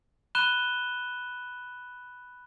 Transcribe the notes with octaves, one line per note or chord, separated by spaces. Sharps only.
B5 F#6 D#7 E7 G7